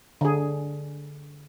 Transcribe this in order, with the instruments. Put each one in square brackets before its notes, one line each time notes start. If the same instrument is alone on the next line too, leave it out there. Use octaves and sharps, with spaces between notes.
[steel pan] D3 G#4